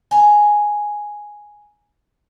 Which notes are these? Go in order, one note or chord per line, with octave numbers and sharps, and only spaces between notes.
G#5 A#5